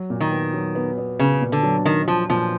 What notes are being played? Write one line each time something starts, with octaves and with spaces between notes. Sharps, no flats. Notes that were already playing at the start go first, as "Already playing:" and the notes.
Already playing: F#3
A#2
D#3
B3
F#3
B3
B3
C#3 B3
A#2
D3
F#3
D#3 D4
F3 F#3
A#2 F3